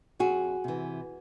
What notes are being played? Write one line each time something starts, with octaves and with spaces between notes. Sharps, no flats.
F2 F#4 G#4
C3 E3